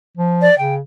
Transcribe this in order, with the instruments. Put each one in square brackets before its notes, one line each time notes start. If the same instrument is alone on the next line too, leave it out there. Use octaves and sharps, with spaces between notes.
[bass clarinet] F3
[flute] D5
[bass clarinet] C#3 [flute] G5